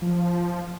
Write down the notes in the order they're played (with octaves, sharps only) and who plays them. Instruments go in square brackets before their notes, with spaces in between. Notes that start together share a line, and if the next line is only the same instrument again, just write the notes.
[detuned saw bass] F3